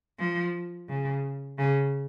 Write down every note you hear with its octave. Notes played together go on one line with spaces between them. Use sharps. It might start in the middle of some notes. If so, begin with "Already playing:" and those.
F3
C#3
C#3